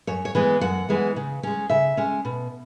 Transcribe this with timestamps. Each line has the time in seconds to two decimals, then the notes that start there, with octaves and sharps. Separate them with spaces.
0.07 F#2 C#5
0.25 C#5
0.35 E3 G#3 B3
0.61 F#2 F#5
0.89 E3 G#3 B3
1.16 C#3
1.43 G#3 C#4
1.70 C#3 E5
1.97 G#3 C#4
2.25 B2